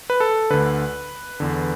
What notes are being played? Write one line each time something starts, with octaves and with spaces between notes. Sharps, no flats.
B4
A4
D2 D3 B4
E2 D3